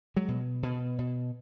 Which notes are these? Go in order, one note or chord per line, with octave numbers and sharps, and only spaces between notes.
F#3 G#3
B2
B2
B2